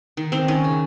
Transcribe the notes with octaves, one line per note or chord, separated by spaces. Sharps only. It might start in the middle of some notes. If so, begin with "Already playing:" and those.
D#3
D#3 C4
D#3 C#4
C#3